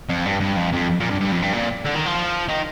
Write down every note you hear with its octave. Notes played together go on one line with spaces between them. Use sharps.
F2
G2
G2
F2
F2
A#2
G2
G2
F2
G2
A#2
D3
D#3
F3
D#3